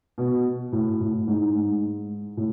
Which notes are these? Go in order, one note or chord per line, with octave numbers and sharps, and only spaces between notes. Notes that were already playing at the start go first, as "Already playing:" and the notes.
B2
A2
A2
G#2
G#2
A2